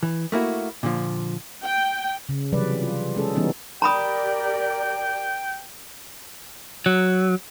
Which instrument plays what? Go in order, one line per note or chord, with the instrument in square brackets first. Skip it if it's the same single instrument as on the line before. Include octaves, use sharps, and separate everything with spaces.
[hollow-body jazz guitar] E3
A3 A#3 E4 F#4
A#2 D3 F3
[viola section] G5
[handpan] C#3
C3 E3 F#3 G3 B4 D5
F4
G#3 C#4 G#4 A4
E3 G3 B3 C#4 D#4
[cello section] G4 A#4 D5 [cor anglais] G5 [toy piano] A#5 B5 D#6
[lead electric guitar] F#3